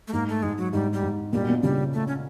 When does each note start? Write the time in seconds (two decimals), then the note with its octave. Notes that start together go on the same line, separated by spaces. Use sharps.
0.08 A3
0.13 G#2 A#3
0.29 A3
0.42 G#2 G#3
0.58 F#3
0.73 G#2 G3
0.93 G3
1.03 G#2
1.33 A#2 G3
1.42 B2
1.50 A#2
1.63 C#3 G3
1.93 A3
2.07 C#4